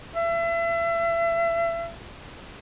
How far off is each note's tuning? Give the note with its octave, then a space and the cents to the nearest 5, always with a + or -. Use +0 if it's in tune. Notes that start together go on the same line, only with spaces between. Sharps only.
E5 +35